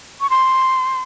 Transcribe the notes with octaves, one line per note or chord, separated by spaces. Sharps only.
C#6
C6